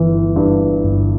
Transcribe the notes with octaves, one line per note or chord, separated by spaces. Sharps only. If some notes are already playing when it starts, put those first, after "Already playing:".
Already playing: G1 E3
G2
G1